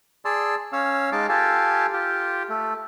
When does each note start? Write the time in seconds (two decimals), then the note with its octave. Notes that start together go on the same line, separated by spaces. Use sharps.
0.25 G#4 D5 A5 C6 E6
0.73 C#4 C#5 F5 E6
1.12 G#3 D#4 D#5 F5 A5 D6
1.29 F4 G4 A4 F5 G#5 A5
1.93 F4 G4
2.49 A3